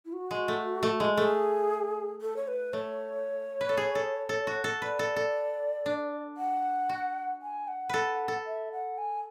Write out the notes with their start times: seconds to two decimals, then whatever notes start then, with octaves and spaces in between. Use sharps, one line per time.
0.05 E4
0.13 F#4
0.31 G#3
0.48 A3
0.83 A3
1.00 G#3
1.17 A3 G#4
2.21 A4
2.36 C#5
2.48 B4
2.73 A3 C#5
3.61 B4
3.69 A4
3.77 G#4
3.95 A4
4.29 A4
4.47 F#4
4.64 A4
4.82 B4 D5
4.99 A4
5.16 A4
5.86 D4
6.37 F#5
6.89 F#4
7.42 G#5
7.68 F#5
7.89 A4 B4
8.28 A4
8.46 E5
8.72 F#5
8.98 G#5